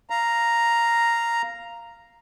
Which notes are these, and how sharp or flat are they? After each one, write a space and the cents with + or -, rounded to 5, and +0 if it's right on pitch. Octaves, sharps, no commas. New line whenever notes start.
F5 -10 A#5 +0